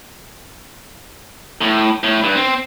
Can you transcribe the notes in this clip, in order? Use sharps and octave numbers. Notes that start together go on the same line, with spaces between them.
A2
A2
G2
C4